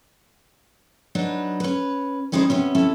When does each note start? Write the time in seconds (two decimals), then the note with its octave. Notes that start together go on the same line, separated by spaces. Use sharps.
1.15 F#3 D4 D#4 B4
1.60 C#4 B4
2.32 G3 G#3 C#4 D#4 E4 C5
2.50 C3 B3 C#4
2.75 C3 C#4 E4 A4